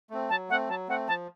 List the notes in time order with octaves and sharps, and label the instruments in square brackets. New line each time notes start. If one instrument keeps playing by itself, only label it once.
[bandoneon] A3 C4
[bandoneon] F#3 [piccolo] A5
[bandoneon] A3 C4 [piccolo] F#5
[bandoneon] F#3 [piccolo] A5
[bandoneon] A3 C4 [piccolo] F#5
[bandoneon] F3 [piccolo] A5